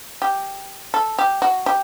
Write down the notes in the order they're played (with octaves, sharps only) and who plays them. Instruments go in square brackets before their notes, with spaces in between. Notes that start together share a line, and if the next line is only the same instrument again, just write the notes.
[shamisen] G4
A4
G4
F#4
G4